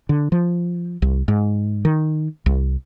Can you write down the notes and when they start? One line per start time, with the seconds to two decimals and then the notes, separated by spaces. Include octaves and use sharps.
0.09 D3
0.32 F3
1.02 C2
1.28 G#2
1.85 D#3
2.46 C2